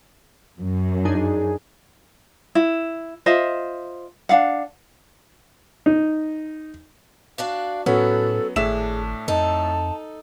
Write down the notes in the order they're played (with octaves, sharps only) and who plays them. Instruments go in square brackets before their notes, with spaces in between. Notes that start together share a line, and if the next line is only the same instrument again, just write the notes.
[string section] F#2
[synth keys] D4 D#4 G#4
[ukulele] E4
F4 C5 D#5 E5
D4 F5 F#5
[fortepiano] D#4
[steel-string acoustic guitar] D4 F#4 D5 [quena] F5
[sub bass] A2 [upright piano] F#3 B3 C#4 [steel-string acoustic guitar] F#4 [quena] A4
[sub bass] G#1 [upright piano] A2 E5 E7 [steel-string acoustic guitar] D4 [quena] G#4
[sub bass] F2 [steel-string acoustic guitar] D#4 A4 [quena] A5